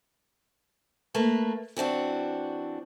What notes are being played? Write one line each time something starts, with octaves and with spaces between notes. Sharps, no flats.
A3 A#3 B4
E3 C4 D4 F#4